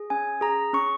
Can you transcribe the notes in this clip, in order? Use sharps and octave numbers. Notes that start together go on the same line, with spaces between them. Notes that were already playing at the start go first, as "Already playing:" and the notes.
Already playing: G#4
C#4 G#5
G#4 A#5
C#4 C#6